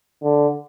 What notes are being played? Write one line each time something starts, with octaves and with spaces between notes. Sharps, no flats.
D3